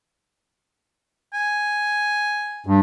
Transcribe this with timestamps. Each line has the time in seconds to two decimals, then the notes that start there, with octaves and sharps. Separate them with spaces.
1.34 G#5
2.66 G2